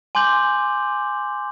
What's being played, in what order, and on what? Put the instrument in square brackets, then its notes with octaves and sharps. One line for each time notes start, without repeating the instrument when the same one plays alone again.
[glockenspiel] G#5 C6 D6 G6 F#7